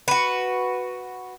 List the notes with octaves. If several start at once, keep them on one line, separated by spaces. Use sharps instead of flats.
F#4 B4